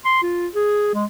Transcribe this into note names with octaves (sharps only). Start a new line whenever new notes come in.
C6
F4
G#4
G#3